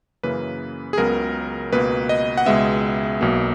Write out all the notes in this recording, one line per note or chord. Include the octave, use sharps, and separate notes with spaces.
F#2 C#3 E3 A#3 B4
G#4
C#2 C#3 F#3 B3 A#4
C#2 B2 A#3 B4
D#5
F#5
C#2 B2 G#3 B3 E5
B1 B2 A#3